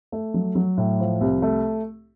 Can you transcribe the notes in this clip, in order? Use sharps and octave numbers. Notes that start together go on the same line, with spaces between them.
A3
F#3
F#3
A2
F3
C2
A3